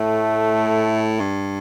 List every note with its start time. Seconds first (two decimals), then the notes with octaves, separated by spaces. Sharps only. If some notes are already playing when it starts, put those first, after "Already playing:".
Already playing: A2 A3
1.20 G2